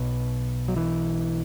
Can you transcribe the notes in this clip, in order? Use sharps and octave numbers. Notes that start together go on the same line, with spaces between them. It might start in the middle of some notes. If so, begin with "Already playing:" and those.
Already playing: B1 B2
F#3
E3